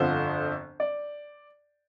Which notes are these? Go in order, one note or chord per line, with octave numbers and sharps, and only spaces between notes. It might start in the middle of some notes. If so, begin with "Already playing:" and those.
Already playing: G1 F2 D3 F3 C5
D5